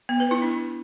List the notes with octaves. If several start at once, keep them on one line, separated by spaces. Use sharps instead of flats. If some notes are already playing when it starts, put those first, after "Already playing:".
B3
B4
E4
D4